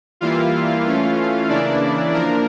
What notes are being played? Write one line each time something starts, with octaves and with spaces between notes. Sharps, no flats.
E3 G3 A#3 E4 F4 F5
E3 A3 C#4 F4
C#3 E3 A#3 D4 E4 D5
F3 A#3 D4 A#4